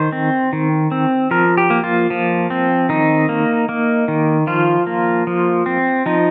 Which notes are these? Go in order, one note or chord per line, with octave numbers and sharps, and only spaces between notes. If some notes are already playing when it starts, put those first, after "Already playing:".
Already playing: D#3 C5
C4
D#3
C4
F3 A#4
G4
A#3
F4
F3
C4
D#3 D#4
A#3
A#3
D#3
F3 F4
A#3
F3
C4
F3 D#4